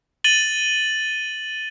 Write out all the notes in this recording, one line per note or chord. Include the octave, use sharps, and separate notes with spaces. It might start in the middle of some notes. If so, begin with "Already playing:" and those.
A6 D#7 F#7 G7